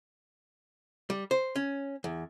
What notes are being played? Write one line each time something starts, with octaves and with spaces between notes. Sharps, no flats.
G3
C5
C#4
E2